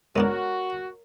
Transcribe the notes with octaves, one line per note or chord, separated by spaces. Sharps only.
G#3 B3 D4 F#4 A#4 C#5